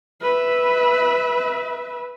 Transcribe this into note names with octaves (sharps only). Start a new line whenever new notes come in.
B4 E5